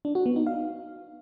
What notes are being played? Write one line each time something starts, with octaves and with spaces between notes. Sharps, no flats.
D4
F#4
B3
D#4
F5